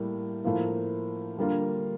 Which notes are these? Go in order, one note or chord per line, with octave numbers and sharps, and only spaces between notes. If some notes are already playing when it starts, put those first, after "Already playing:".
Already playing: A2 G3 A#3
A2 F3 A#3 F4
D3 G3 A#3 F4